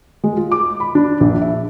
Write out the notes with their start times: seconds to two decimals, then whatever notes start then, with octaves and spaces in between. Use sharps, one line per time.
0.24 G#3
0.37 F4
0.52 D6
0.80 B5
0.95 D4
1.20 A#1
1.42 E5